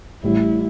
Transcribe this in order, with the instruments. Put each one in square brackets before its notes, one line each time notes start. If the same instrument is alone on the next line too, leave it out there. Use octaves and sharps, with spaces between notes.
[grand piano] A1 A2 G3 [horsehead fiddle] E4